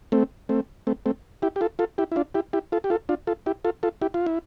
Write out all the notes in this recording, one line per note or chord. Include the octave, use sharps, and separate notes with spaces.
A3 C4
A3 C4
A3 C4
A3 C4
E4 G4
G4
F4 A4
F4 A4
E4 G4
E4
D4 F4
E4 G4
E4 G4
F4 A4
G4
F4 A4
D4 F4
F4 A4
E4 G4
F4 A4
F4 A4
E4 G4
F4
E4